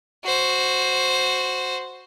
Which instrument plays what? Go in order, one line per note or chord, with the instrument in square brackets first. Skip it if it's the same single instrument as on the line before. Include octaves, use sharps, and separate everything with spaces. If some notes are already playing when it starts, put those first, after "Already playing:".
[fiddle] F#4 C5